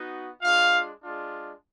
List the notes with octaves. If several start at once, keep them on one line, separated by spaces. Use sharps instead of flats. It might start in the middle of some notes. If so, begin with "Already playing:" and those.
Already playing: B3 D#4 F#4
G#3 D4 F4 F5
G#3 D4 F4